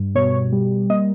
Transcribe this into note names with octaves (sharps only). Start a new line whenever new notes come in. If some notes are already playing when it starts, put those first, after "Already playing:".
Already playing: G2
B2 C#5
G3
A#3 D#5